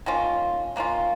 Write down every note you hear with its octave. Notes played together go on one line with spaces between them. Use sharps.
D#3 A#3 C#4 F4
D#3 A#3 C#4 F4